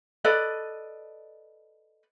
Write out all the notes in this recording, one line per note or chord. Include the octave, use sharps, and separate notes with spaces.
A4 B4 D5 D#5